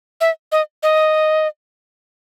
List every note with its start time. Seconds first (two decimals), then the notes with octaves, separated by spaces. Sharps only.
0.21 E5
0.52 D#5
0.83 D#5